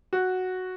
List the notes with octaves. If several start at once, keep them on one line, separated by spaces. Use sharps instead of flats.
F#4